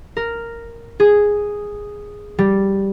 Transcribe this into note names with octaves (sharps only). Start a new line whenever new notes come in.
A#4
G#4
G3